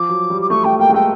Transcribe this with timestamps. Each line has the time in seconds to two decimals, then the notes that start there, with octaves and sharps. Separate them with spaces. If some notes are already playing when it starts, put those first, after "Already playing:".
Already playing: F3 D6
0.09 F#3
0.30 G3
0.42 D6
0.50 A3 C#6
0.64 A3 G5
0.79 A#3 G5
0.89 G#3
0.94 A3 G5